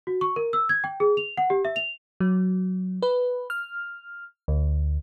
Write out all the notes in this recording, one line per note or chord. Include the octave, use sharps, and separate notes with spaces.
F#4
C#6
A#4
E6
G#6
G5
G#4
F7
F#5
G4
E5
F7
F#3
B4
F6
D2